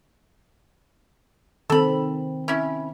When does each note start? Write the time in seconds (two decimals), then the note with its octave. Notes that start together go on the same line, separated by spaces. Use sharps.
1.70 D#3 C4 A4 B5
2.48 C#4 E4